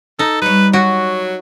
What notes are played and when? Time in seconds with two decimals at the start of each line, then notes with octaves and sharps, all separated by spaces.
0.19 D#4 A4
0.42 G3 B4 C#5
0.73 F#3 F#4